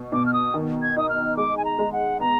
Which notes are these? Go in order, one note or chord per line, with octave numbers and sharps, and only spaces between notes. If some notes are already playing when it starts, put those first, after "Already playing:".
Already playing: B2
B2 D6
F6
D#6
D#3
G#6
D#4 D#6
F6
G#3 D6
G#5
A#5
G#3
F#5
B3 A#5